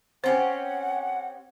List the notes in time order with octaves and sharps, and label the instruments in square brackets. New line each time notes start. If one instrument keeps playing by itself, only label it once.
[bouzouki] C4 C#4 G4 [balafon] C5 [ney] F#5